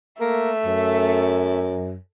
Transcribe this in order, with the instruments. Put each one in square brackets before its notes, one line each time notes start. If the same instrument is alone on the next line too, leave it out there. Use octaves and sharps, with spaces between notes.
[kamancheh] A3 E5 [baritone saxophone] A#3
[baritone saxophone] F#2